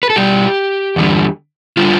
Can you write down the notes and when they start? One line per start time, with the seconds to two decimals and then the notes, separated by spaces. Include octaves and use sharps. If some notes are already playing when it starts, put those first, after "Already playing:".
0.03 B4
0.10 A4
0.16 B2 G3 G4
0.96 E2 D3 G3
1.77 D3 G3 F4